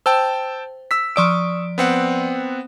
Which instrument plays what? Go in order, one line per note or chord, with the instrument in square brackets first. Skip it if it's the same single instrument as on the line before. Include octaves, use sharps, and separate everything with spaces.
[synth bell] C5 [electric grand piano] G5 A5 E6
[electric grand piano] E6 B6
[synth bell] F3 D5 D7 [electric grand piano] C#6 D#6 E6
[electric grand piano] B3 C4 F#5